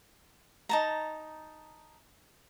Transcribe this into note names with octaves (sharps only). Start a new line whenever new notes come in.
D#4 A5 A#5